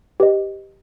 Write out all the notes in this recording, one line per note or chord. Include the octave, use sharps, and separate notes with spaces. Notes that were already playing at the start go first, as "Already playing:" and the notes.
G4 B4 D#5